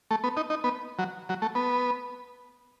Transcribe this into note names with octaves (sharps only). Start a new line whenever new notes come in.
A3
B3
D#4
D#4
B3
F#3
F#3
A3
B3